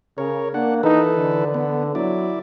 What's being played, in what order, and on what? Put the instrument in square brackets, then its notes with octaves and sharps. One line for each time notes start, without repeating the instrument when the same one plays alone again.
[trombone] C#3 [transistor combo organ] A#4 C#5
[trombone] A#3 [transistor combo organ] D4 F#5
[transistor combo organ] E3 A4 B4 [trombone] D#4
[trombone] D3
[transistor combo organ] B3
[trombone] F#3 [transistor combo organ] E4 D5